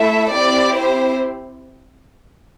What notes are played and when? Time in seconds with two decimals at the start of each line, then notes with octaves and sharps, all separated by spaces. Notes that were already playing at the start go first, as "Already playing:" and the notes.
Already playing: A3 E4 A4 E5
0.34 C4 E4 G4 D5
0.75 C5